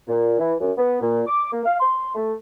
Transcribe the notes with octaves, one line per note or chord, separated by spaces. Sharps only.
A#2
E3
F#2
B3
A#2
D6
A#3
F5
C6
A3